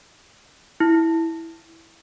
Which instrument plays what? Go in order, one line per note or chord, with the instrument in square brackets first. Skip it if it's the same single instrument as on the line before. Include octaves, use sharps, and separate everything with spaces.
[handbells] E4